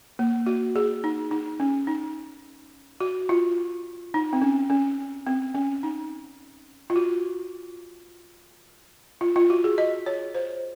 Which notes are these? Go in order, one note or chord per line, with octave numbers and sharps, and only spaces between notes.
A#3
F#4
G#4
D#4
D#4
C#4
D#4
F#4
F4
D#4
C4
C#4
C#4
C4
C#4
D#4
F4
F#4
F4
F4
F#4
G#4
D#5
C#5
C5